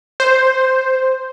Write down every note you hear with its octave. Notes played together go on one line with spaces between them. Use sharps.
C5